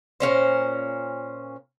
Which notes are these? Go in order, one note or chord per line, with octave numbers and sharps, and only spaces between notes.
A#2 G3 C#4 C5